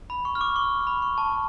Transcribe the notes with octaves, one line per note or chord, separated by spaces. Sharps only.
B5
C#6
F6
D6
C#6
B5
C#6
A5